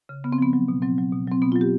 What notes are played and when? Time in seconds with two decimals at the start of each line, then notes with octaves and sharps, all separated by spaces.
0.09 C#3
0.24 C#3 B3
0.33 C4
0.38 F3 B3
0.53 F#3
0.68 B2
0.82 F#3 C4
0.98 F#3
1.12 B2
1.27 F#3 C4
1.42 B2 B3
1.52 F4
1.56 F#3
1.61 G4